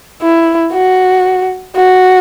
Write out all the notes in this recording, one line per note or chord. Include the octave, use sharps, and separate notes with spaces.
E4
F#4
F#4